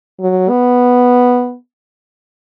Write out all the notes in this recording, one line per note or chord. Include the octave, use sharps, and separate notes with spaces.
F#3
B3